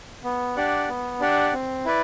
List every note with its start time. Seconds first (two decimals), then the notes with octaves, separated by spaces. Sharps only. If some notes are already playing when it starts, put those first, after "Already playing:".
0.24 B3
0.56 D4 G4 D5 F#5
0.89 B3
1.20 D4 G4 D5 F#5
1.53 C4
1.85 E4 B4 D5